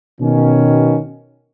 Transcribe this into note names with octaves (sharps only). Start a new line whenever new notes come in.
B2 D#3 C#4